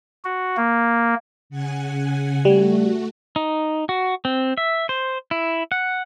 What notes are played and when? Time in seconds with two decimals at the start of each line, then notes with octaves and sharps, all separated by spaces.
0.25 F#4
0.57 A#3
1.50 C#3 F#5 G#5
2.45 G3 A3 F#4
3.36 D#4
3.89 F#4
4.25 C4
4.58 E5
4.89 C5
5.31 E4
5.72 F#5